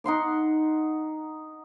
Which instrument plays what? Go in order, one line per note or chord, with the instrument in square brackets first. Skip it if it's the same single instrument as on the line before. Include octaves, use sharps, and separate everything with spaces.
[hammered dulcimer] D#4 F#5 C6 D6